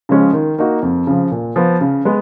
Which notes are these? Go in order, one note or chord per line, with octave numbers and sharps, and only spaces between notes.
C#3 F3 G#3 C#4
D#3
A#3 D#4 F#4
F2
C#3 F3
A#2
F3 B3
C#3
G#3 B3